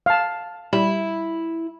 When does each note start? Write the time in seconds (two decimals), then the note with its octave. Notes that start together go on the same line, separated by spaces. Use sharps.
0.06 F5 A5
0.73 G3 E4